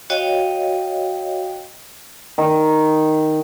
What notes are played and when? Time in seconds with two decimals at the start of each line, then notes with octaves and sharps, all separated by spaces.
0.10 F#4 C#5 D#5 F5 G5
2.38 D#3